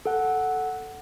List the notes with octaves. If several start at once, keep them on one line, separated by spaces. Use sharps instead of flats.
A4 F#5